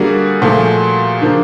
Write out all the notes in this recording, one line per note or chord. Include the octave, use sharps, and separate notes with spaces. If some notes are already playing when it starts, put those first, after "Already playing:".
Already playing: D3 G3 A#3 F#4 G#4
A#2 F3 A3
D3 F3 A#3